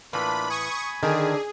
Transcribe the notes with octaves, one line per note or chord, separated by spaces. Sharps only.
A2 E3 A#3 D4 F4 B4 B5
G#5 B5 C#6 D#6
D3 D#3 D4 D#4 G#4